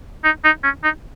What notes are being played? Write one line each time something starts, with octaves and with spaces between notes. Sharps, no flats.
D#4
D#4
C#4
D#4